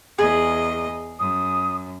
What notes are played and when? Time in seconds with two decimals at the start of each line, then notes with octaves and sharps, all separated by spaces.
0.19 E2 G#4 D#5
1.20 F#2 D#6